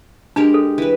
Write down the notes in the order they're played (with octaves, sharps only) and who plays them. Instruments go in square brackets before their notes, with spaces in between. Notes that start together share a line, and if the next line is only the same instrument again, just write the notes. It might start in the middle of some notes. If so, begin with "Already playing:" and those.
[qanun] G#3 G4 A#4 [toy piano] D4
[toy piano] A4
[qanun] E3 B4